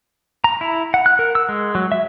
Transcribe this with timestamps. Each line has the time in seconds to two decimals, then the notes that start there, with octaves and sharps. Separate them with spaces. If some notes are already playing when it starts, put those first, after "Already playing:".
0.44 A#5
0.61 E4
0.94 F#5
1.06 F#6
1.19 A#4
1.35 E6
1.49 G#3
1.75 F#3
1.92 E5